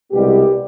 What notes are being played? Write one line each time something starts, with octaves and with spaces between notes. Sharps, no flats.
C2 B2 G3 G#3 B3 G4